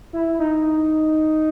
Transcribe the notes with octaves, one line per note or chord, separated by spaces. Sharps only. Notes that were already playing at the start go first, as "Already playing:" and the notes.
E4
D#4